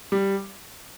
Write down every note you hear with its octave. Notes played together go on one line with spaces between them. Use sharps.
G3